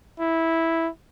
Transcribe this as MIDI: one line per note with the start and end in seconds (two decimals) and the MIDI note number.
0.20 0.89 64